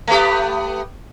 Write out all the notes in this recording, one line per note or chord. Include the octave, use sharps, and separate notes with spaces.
A3 B3 G4